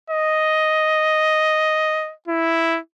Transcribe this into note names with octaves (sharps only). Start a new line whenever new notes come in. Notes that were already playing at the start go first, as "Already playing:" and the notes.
D#5
E4